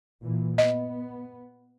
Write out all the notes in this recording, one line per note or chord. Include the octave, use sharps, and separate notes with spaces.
A#2 E3
B3 D#5